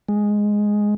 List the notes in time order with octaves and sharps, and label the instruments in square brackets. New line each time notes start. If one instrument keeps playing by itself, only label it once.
[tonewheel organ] G#3